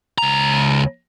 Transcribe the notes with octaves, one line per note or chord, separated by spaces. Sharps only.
C#2 A#5